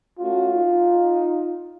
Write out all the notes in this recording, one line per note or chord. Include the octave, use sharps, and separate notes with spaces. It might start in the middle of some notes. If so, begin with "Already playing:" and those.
A3 C#4 F4 F#4
D#4